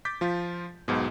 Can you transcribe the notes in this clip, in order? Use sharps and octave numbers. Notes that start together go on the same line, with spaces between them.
D6 G6 A6 B6
F3 F4
B1 G#2 B2